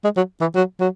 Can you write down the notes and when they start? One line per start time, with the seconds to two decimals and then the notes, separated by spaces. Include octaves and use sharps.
0.04 G#3
0.17 F#3
0.41 E3
0.55 F#3
0.80 F#3